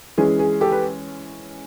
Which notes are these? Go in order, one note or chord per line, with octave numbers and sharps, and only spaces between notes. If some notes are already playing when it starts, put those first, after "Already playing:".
E3 G#3 C#4 G#4
G#4
G4 A4
B4